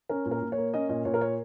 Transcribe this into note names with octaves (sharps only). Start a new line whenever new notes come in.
C#4 A#4
A#2
A#4
A#2
C#5
A#3
C#4 D#5
A#2 D#5
A#2 C#5
A#4
A#3 C#5